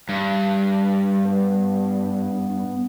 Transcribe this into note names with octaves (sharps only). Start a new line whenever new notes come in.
G2
B3